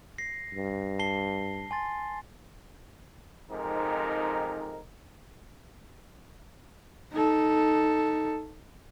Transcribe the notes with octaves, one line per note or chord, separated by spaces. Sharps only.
A#6 C7
G2
A5 C7 G7
G#5 C6 A6
F2 G#2 C3 D#4 A#4
D#4 A4